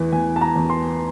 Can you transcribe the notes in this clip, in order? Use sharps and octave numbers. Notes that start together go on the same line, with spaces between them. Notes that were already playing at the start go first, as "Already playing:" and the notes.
Already playing: E2 E3
E2 G#5
A5
A#5
E2
C6